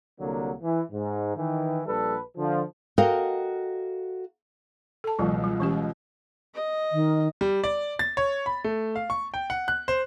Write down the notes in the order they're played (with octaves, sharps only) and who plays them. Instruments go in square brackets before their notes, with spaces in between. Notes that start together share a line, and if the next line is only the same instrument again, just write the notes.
[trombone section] C2 D3 F#3 A#3
E3
G#2
D#3 E3
A#1 G3 A4 B4
D3 F3
[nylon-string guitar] F#4 A4 A#4 D#5 F5 G5
[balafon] A4 A5
[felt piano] C#2 B2 [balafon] E3 F#3
[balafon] G3
E3 C#4 G4
[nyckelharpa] D#5
[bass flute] D#3
[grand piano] G3
D5
A6
C#5
B5
A3
F5
C#6
G5
F#5
F#6
C5